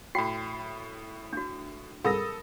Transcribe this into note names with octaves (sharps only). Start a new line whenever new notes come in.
A2 F#4 G5 B5 C7
D4 F#4
C2 G#2 A4 A#4 B5 D#6 A#6